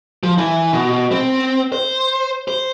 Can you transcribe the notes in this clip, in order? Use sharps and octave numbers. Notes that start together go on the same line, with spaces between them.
F3
E3
B2
C4
C5
C5